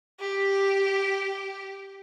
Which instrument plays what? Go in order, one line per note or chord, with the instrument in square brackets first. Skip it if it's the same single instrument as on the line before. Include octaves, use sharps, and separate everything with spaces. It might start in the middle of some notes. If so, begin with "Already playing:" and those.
[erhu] G4